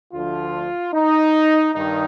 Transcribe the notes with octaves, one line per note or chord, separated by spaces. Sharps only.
D2 D3 F3 F4
D#4
G2 D#3 D#4